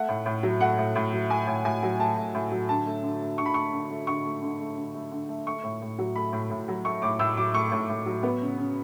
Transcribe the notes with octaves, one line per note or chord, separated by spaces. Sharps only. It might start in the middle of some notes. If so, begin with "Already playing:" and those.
Already playing: A3 F#5
A2
A2
F#3
A3 F#5
A2
A2
F#3
A3 G#5
A2
A2 G#5
F#3
A3 A5
A2
A2
F#3
D3 A5
A3
D3
A3
D3 C#6
B5
A3 C#6
D3
A3
D3 C#6
A3
D3
A3
D3
A3
D3
A3
A3 C#6
A2
A2
F#3
A3 B5
A2
A2
F#3
A3 C#6
A2 D6
A2 E6
F#3 D6
A3 C#6
A2
A2
F#3
B3
C#3
C#3